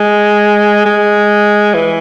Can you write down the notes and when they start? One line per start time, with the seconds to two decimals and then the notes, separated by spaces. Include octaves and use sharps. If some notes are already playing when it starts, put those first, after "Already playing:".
Already playing: G#3
0.85 G#3
1.74 E3